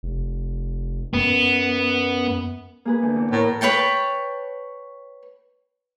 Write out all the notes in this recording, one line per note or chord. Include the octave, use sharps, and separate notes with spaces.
F1
F#2 B3
A#3 G#4 B4
D2
E2
A2 A#4
B4 C#5 G5 A5